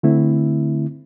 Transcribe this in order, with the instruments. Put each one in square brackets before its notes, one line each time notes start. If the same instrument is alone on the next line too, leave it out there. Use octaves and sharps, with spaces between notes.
[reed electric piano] D3 A3 C4 E4